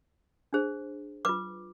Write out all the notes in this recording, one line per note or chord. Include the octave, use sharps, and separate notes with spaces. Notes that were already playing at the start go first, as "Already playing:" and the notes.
D4 G#4 C5
F4 B4 D6